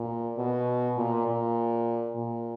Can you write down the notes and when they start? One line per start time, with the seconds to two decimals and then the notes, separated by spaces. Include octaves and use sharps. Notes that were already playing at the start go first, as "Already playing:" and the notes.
Already playing: A#2
0.38 B2
0.97 A#2
1.27 A#2
2.16 A#2